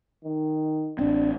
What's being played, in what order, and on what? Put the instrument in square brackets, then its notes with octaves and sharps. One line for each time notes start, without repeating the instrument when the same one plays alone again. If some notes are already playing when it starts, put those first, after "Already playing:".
[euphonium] D#3
[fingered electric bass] A1 C4 [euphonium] D4